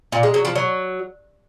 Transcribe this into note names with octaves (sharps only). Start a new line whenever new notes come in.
A#2
G#3
F#3
F3
F#3